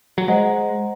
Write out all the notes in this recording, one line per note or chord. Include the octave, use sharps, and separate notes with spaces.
F#3
G#3 C5 D#5 F#5 A#5